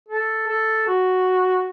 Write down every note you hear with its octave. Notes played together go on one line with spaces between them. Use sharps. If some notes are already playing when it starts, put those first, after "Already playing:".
A4
A4
F#4